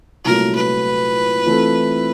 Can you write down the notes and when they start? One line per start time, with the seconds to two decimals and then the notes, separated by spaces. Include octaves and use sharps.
0.25 C2 A#2 F#3 A3 A#4
0.55 B4
1.46 E3 A3 C4 F4 A4